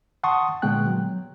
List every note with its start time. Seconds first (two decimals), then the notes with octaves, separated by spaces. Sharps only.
0.23 F#5 A5 C6 C#6 D#6
0.62 A#2 D3 G#3 B3 G5 F#6
0.87 F#3